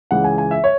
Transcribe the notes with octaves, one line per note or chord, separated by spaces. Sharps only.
C#2 C#3 E3 G#3 F#5
G#5
G#5
E5
C#5